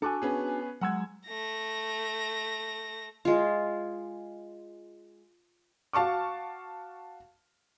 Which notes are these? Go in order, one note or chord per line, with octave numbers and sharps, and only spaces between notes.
D4 F#4 A4 G#5
B3 C#4 G#4
F#3 G#3 F#5 E6 G#6
A3 A#6
G#3 F4
F#4 F5 A5 C#6 D6